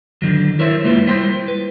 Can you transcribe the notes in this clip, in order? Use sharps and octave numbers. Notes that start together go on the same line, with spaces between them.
D3 D#3 F#3
E4 A#4 C5 C#5 E5
G#3 A#3 E4 F4 B4
G3 E4 C5 G5 C6
B4